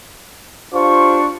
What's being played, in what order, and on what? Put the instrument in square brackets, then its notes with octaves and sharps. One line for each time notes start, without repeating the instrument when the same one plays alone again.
[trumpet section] D4 C#6 [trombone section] F4 G4 C5